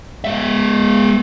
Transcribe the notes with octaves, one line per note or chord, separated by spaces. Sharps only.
G#3 E5